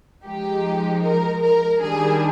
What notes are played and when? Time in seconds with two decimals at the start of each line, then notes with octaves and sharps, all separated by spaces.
0.24 F3 G#3 D#4 G4
1.03 A#4
1.42 A#4
1.80 D#3 G3 D4 G#4